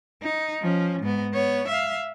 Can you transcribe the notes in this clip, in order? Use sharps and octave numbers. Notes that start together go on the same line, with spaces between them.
D#4
F3 C#4
G#2 B3
B3 C#5
E5 F5